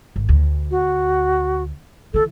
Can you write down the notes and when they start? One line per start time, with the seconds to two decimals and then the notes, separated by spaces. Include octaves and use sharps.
0.16 G#1
0.29 D2
0.71 F#4
2.14 D3 E3 A4